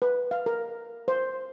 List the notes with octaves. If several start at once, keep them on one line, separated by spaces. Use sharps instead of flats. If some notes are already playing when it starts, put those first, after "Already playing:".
B4
F5
A#4
C5